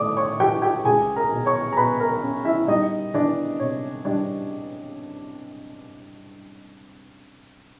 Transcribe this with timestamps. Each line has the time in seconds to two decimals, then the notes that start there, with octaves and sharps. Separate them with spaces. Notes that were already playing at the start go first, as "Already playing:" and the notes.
Already playing: A2 A3 D5 D6 D#6
0.17 C#5 C#6
0.39 E3 G4 G5
0.62 G4 G5
0.85 C#2 G#4 G#5
1.16 A#4 A#5
1.31 B2
1.46 C#5 C#6
1.73 A#5
1.77 B2 B4 B5
2.00 A#4 A#5
2.23 C#4
2.45 E4 E5
2.68 G3 D#4 D#5
3.14 E3 D4 D5
3.59 C3 C#5
4.05 G3 D4 D5